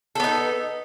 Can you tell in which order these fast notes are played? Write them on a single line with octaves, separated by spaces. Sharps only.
A4 B3 D#4